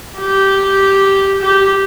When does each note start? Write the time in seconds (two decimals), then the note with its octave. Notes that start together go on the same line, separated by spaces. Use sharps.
0.19 G4
1.42 G4